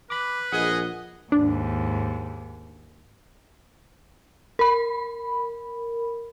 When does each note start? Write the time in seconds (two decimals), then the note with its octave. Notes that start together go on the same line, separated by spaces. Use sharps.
0.10 B4 B5 D6
0.52 A#1 G#4 D#5 F#5
1.32 D#2 G#2 D4
4.59 A#4 B5